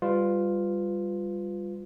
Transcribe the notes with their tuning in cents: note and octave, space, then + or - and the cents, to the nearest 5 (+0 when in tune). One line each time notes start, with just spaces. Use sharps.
G3 +20 F4 +0 B4 +25